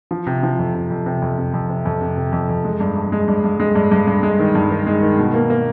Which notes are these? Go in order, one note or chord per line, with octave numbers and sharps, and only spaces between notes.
F3
C3
F3
F2
C3
F2
C3
F2
C3
F2
C3
F2
C3
C3
F2
F2
G#3
G2
G2
G#3
G2
G2
G#3
G2
G2
G2
G#3
D#3
G2
D#3
G#3
D#3
B2
A#3
A#3